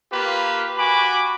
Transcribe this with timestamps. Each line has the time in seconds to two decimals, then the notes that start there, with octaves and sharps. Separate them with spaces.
0.12 A#3 F4 G4 B4
0.78 F#4 G#5 B5 D6